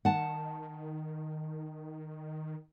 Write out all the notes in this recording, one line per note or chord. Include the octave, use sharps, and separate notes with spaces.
D#3 F#5 A5